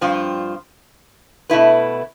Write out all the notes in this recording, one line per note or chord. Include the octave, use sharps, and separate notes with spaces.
G2 F3 C4 F4
B2 A3 E4 B4